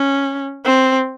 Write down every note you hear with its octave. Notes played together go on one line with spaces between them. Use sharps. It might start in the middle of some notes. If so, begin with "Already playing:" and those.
Already playing: C#4
C4